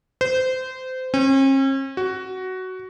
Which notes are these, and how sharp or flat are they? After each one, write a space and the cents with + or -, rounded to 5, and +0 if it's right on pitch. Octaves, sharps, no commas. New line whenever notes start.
C5 -25
C#4 -45
F#4 +10